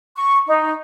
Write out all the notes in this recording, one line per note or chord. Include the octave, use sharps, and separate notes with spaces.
C#6
D#4